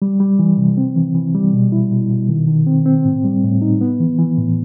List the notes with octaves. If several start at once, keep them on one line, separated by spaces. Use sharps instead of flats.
G3
G3
E3
C3
C4
E3
E3
G3
B2
E4
B2
B2
D#3
D#3
C4
C4
A2
G3
A2
D#4
B3
E3
E3
A2